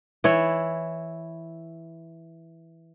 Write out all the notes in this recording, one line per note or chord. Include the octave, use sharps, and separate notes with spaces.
E3 E4 C#5